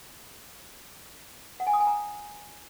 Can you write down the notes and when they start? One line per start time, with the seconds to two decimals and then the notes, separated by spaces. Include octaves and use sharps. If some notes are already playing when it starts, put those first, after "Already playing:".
1.60 F#5
1.67 G#5
1.73 D#6
1.80 G#5
1.87 A#5